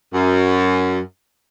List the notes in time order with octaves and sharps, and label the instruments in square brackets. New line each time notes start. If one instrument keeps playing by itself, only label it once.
[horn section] F#2